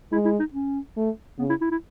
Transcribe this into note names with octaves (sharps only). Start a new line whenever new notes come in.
G#3 E4
E4
D#4
C#4
A3
C#3 B3
E4
E4
E4